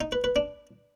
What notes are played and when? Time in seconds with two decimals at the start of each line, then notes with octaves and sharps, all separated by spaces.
0.01 D#4
0.12 B4
0.24 B4
0.36 D4